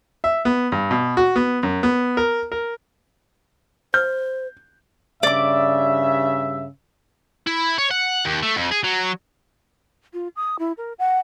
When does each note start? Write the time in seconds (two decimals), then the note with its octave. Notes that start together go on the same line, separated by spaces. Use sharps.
0.24 E5
0.45 B3
0.72 G2
0.91 B2
1.17 F#4
1.36 B3
1.63 F#2
1.83 B3
2.17 A#4
2.52 A#4
3.94 C5 F6 G6
5.23 G2 C#3 D5 E5 D6
7.47 E4
7.78 C#5
7.91 F#5
8.25 D#2
8.43 A3
8.57 F2
8.72 G#4
8.84 F#3
10.14 F4
10.36 D#6
10.59 E4
10.77 A#4
10.99 F#5